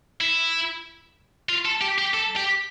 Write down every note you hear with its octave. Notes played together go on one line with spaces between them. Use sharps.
E4
F4
A4
G4
G4
A4
G4